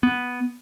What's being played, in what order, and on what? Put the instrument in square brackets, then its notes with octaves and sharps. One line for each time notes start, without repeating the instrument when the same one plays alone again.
[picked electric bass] B3